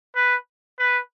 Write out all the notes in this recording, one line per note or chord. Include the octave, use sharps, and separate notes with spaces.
B4
B4